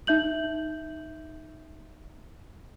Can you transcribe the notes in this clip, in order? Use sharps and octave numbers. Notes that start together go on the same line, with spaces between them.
D#4 E5 G6 F#7